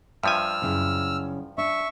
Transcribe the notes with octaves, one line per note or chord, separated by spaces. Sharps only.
G2 F3 E5 G#5 E6 F6
F#2 C#3 E4
D4 E5 C#6